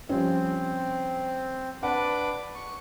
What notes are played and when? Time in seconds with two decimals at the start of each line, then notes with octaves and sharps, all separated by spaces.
0.09 F3 G3 C4 C#4
1.83 D4 B4 F#5 D6
2.55 C#6